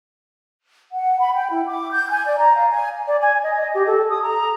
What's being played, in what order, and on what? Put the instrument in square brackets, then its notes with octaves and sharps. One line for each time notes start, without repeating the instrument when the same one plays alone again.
[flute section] F#5
B5
G5
E4
D6
G6
G#5
D5
A#5
F5
G#5
[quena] D5
G#5
D#5
D#5
G4
A4
D#6
A#5